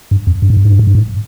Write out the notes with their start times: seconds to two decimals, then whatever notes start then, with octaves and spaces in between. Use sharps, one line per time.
0.11 G2
0.27 F2
0.42 G2
0.50 G#2
0.57 G2
0.65 G#2
0.73 G2
0.79 G#2
0.87 G2
0.95 G#2